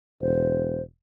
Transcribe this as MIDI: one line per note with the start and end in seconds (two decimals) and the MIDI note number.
0.21 0.81 28
0.21 0.82 72